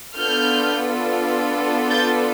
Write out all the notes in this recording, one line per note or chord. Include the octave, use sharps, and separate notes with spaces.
B3 D4 F4 A4 F6 G6
G6 A6